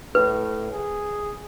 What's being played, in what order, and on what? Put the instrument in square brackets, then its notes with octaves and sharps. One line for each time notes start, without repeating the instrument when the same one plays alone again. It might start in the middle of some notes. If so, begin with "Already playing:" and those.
[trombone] A2 [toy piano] B4
[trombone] G#4